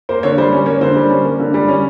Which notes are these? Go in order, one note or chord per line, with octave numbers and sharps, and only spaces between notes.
A#3 C5
C5
D3 C#5
G3 C5
C#4
A#3 C#5
D3 C5
G3
C#4
A#3
D3
G3
C#4